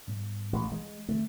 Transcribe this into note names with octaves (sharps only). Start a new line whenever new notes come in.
G#2 G3 B3
A1 G#3
E3 G#3
D3 A3 C4